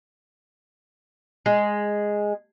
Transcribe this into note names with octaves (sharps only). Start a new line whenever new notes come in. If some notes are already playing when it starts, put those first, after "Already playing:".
G#3